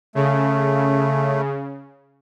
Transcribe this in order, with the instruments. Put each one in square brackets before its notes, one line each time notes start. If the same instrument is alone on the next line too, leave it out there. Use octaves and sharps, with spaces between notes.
[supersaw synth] C#3 [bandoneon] A3